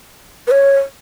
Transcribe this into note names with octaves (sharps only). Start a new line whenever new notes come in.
B4
C#5